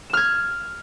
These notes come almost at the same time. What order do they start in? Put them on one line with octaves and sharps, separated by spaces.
E7 F6 G#6